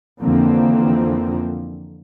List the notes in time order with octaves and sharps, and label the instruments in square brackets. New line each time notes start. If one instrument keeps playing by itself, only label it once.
[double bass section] F2 D3 E3 F3 A#3 C4